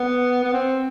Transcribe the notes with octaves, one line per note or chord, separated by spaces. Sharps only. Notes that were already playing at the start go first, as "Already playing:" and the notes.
Already playing: B3
B3
C4